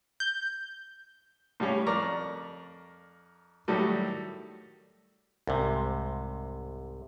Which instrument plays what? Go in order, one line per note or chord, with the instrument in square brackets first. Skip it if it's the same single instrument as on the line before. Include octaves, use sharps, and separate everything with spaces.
[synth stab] G6
[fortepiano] A2 C#3 G3 C#4
F2 A#4 D5 A#5 C#6
A2 D#3 F#3 G3 A3
[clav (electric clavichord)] C2 G#2 C3